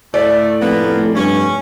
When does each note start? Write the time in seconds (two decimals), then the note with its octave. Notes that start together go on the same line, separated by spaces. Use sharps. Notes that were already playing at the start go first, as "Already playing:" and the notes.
0.14 A2 A3 D5
0.61 F1 A#3 B3
1.16 G2 C#4